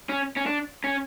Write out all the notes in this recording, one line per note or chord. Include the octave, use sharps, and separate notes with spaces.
C#4
C#4
D4
C#4